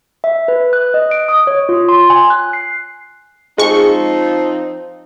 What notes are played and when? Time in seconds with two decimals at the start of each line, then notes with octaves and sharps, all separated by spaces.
0.24 E5
0.48 B4
0.73 F#6
0.94 D#5
1.11 D7
1.28 D#6
1.47 C#5
1.69 F4
1.89 C6
2.10 G#5
2.30 F#6
2.53 C7
3.58 F3 G#3 C4 D#4 C#6